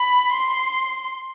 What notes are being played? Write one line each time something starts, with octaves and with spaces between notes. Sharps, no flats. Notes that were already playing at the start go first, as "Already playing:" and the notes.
Already playing: B5
C6